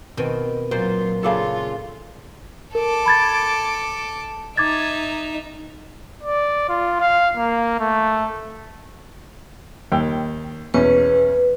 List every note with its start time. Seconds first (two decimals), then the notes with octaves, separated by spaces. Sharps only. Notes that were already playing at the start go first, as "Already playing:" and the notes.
0.17 B2 D#3 C4
0.71 A#2 F#3 F4 C5
1.23 C#3 D4 F4 A4
2.75 A4 A#4 D6
3.06 B5 G#6 A6
4.57 D#4 E5 D6 G#6 A6
6.23 D5
6.69 F4
7.00 F5
7.37 A#3
7.80 A3
9.92 D#2 G5
10.74 E2 B2 C#4 B4